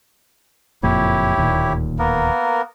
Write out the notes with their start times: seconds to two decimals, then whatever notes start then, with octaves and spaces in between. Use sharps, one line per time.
0.83 F#1 F2 A#2 E4 G4 C#5
1.37 D1 D#2 A#2
1.99 A#3 B3 A#4